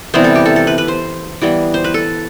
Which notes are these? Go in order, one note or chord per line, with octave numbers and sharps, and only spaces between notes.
C3 E3 G3 B3 C5
A4
G4
A4
A4
B4
B4
C5
E3 G3 B3
C5
B4
A4